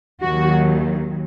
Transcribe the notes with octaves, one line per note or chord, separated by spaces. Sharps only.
D#2 D#3 F#3 F#4